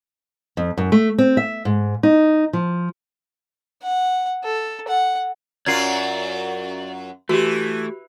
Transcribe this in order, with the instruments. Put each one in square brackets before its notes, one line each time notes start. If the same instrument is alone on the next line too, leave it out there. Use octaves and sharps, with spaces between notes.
[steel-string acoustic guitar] F2
F#2
A3
C4
E5
G#2
D#4
F3
[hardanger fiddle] F#5
A4
F#5
[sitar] F#2 F#3 F4 [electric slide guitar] D5 [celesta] G#6 C7
[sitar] E3 [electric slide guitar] A3 [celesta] F#4 G4